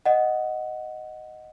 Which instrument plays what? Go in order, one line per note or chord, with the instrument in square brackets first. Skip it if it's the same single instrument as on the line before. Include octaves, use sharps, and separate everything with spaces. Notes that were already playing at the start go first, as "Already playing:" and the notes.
[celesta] D#5 F#5